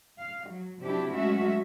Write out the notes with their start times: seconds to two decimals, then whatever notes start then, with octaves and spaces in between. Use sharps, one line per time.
0.21 F5
0.50 F#3
0.82 C3 F#3 D4 E4 G4
1.15 F#3 G#3 A3 C#4 F#4 E5